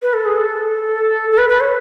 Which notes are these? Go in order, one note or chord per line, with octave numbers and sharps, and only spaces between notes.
B4
A4
G#4
A4
A4
B4
B4
C#5